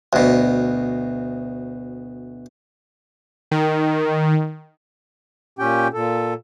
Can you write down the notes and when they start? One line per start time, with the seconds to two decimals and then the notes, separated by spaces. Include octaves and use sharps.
0.13 D2 B2
3.51 D#3
5.59 A#2 C#4 G4 G5
5.93 A#2 A4